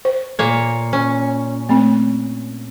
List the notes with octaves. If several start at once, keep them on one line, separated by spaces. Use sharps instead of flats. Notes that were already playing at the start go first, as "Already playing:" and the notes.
C5
A#2 A#3 C#5
C#4
A3 C4